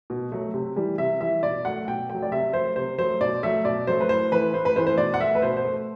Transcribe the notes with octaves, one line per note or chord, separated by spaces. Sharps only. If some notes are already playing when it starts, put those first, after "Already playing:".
B2
F#3 A3
C3
E3 G3
C3 E5
E3 G3 E5
B2 D5
F#3 A3 F#5
B2 G5
F#3 A3 G5
D5
C3 E5
F#3 A3 C5
C3 C5
F#3 A3 C5
B2 D5
F#3 A3 E5
B2 D5
F#3 A3 C5
B4
A2 C5
E3 A3 B4
A2 C5
B4
E3 A3 C5
C5
B2 D5
F#5
A3 E5
B4
B2 C5
C5
A3